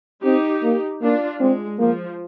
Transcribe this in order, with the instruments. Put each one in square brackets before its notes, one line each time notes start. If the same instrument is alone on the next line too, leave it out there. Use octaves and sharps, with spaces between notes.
[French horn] C4 [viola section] D#4 G4
[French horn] A#3
[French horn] A#3 [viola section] D4 F4
[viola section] G#3 [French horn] C4
[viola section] F3 [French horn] A#3